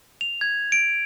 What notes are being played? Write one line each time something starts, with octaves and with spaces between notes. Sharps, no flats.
F7
G#6
D7